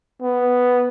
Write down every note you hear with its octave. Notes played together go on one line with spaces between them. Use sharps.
B3